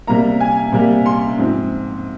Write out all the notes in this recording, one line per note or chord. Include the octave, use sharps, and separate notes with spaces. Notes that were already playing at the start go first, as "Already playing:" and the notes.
C3 G3 A#3 A#5
G#5
C3 G3 A#3
C6
G#2 F3 C4